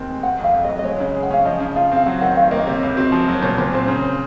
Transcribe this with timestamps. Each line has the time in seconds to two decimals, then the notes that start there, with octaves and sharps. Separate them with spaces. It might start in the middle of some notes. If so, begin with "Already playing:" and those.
Already playing: D#2 D#3 C4
0.09 G#3
0.23 D#3 F#5
0.39 F2 F5
0.54 F2
0.65 F#3 D#5
0.79 D#5
0.84 G#3 C#5
1.00 C#3
1.15 G#4
1.23 F#5
1.31 C#4 F5
1.45 F3 D#5
1.61 C#3
1.76 F4 F5
1.92 C4 F5
2.06 F#3 F#5
2.21 D#3 F#5
2.37 D#3 F5
2.48 F5
2.51 A#3 D#5
2.67 C3 C#5
2.83 C#2
2.97 C4 F#4
3.12 F3
3.28 F#3 C#5
3.43 A#2 C#5
3.58 A#2 C5
3.73 C4 C5
3.88 C#3 C#5